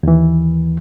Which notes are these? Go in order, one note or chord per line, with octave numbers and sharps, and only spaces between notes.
D#2 E3